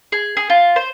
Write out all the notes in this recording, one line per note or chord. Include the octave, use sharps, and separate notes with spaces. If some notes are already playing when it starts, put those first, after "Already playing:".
G#4
G#4
F4
C5